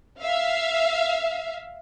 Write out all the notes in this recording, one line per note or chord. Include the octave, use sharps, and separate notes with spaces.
E5 F5